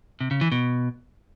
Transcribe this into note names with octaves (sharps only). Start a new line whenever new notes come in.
C3
C#3
E3
B2